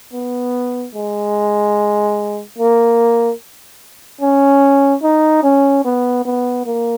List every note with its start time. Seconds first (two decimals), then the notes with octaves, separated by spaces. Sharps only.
0.13 B3
0.95 G#3
2.58 A#3
4.21 C#4
5.03 D#4
5.43 C#4
5.85 B3
6.25 B3
6.66 A#3